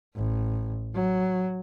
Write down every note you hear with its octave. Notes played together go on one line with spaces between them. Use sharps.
A1
F#3